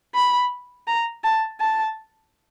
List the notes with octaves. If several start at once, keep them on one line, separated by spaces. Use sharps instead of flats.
B5
A#5
A5
A5